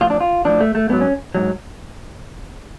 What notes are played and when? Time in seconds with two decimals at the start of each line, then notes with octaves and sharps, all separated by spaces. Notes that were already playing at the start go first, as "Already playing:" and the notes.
0.01 A2 F3 F4
0.10 D4
0.21 F4
0.45 A2 F3 D4
0.60 A3
0.75 A3
0.89 G#2 F#3 B3
1.01 C#4
1.35 G#2 F#3